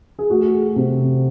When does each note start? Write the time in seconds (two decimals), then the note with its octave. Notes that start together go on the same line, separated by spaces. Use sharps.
0.19 G#4
0.30 A3 F#4
0.76 C3